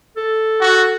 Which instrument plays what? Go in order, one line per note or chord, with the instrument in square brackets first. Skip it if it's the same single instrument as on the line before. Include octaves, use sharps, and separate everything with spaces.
[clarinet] A4
[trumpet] F#4